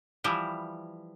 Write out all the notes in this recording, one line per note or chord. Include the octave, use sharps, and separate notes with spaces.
E3 F3 G3 E4